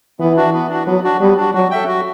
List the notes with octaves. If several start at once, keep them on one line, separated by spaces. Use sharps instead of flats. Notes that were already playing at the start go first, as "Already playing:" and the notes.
E3 B3
D4 F#4
B3
D4 F#4
F#3 B3
D4 F#4
G3 B3
D4 F#4
F#3 F#4
A4 E5 G5
F#4